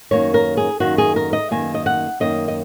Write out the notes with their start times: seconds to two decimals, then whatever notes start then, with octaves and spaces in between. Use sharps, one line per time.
0.11 F#2 D#3 A#3 C#5
0.34 A#4
0.57 G#4
0.80 F#2 D#3 A#3 F#4
0.98 G#4
1.16 A#4
1.33 D#5
1.51 F#2 D#3 A#3 G#5
1.74 D#5
1.86 F#5
2.20 F#2 D#3 A#3 D#5
2.48 D#5